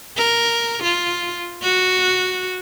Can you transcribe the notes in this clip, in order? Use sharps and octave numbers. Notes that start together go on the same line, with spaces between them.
A#4
F4
F#4